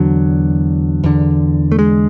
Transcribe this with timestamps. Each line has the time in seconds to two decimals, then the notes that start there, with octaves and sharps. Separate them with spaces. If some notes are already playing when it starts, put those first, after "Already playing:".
Already playing: E2 D3 F#3
1.04 E2 D3
1.72 A3
1.79 G#3